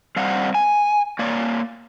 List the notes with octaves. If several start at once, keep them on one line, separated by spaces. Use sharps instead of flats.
G3 C4 F5 F#5
G#5
A#3 C#5 D5